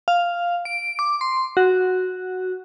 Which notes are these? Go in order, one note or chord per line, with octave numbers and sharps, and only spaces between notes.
F5
D7
D6
C6
F#4